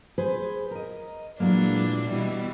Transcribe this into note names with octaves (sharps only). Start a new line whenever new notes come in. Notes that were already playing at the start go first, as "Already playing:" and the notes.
G#4 B4 C5
A#4 D#5
A#2 E3 F#3 G#3 A#3 D4
B2 E3 G3 E5